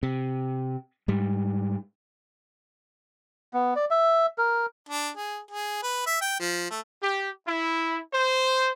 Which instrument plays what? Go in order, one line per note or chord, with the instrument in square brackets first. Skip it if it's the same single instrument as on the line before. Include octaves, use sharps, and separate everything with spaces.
[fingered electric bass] C3
G#2 G3
[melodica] B3
D5
E5
A#4
[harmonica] D4
G#4
G#4
B4
E5
G5
F3
A3
[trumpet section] G4
E4
C5